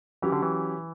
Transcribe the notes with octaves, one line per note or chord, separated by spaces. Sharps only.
E3 F#3 C#4 G4
D3
E3